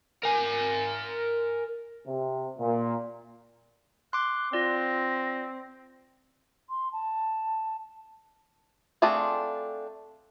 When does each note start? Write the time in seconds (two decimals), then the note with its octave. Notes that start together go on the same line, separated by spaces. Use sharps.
0.23 A#4 G#5
2.06 C3
2.58 A#2
4.13 C6 D6 F#6
4.53 C4 F4 D5 A#6
6.70 C6
6.92 A5
9.02 A3 C4 D4 F4 G#4